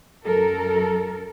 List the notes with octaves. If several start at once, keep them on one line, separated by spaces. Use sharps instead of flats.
F#2 A4 A#4